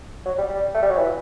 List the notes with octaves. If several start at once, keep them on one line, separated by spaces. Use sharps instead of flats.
F#3
G3
G3
A3
G3
F#3
E3